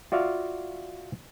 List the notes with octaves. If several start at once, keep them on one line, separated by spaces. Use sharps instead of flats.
F4 F#4 D5 E5 F5